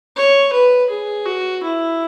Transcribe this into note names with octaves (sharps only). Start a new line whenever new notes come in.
C#5
B4
G#4
F#4
E4